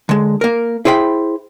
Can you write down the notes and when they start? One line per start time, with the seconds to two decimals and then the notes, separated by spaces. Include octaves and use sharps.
0.09 D3 G#3
0.41 A#3 A#4
0.85 E4 G#4 C5 G5 B5